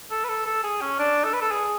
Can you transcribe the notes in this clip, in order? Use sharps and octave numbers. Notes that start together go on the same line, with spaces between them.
A4
B4
A4
A4
G#4
C#4
D4
A4
B4
A4
G#4